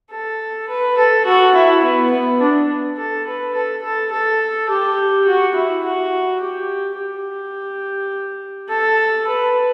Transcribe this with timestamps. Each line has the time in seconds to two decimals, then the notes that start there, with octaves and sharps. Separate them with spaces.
0.11 A4
0.69 B4
0.97 A4
1.25 F#4
1.55 E4
1.83 B3
2.11 B3
2.40 D4
2.97 A4
3.26 B4
3.55 A4
3.83 A4
4.11 A4
4.68 G4
5.26 F#4
5.55 E4
5.84 F#4
6.40 G4
6.98 G4
8.69 A4
9.27 B4